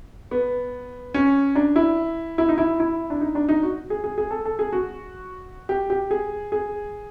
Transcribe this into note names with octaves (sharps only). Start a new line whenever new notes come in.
B3
C#4
D4
E4
E4
D#4
E4
E4
D4
D#4
D4
D#4
F#4
G#4
G#4
G#4
A4
A4
G#4
F#4
G4
G4
G#4
G#4